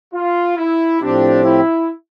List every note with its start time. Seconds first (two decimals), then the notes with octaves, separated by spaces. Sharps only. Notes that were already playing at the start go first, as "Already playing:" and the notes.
0.14 F4
0.57 E4
1.01 A2 F3 C4 D4 G4
1.44 E4